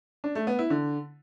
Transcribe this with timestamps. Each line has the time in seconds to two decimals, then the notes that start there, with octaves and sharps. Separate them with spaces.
0.24 D4
0.35 A3
0.47 B3
0.59 E4
0.70 D3